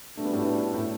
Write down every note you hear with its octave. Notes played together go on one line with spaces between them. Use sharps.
B2 G3 A3 D4
B3
A2 A3
A2 A3